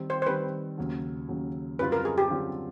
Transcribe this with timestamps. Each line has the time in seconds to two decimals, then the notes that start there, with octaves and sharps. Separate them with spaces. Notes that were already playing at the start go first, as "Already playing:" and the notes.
Already playing: D#3 G3 C4
0.10 C5
0.22 C5
0.27 D#3 G3 C4 B4
0.78 D#2 C#3 F#3
1.29 D#2 C#3 F#3
1.79 F#2 D3 G3 C4 F4 B4
1.92 A#4
2.05 G#4
2.18 G4
2.30 F#2 D3 G3 C4 F4